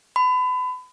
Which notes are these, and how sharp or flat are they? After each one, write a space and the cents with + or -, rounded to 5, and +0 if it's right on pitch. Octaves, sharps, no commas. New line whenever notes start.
B5 +30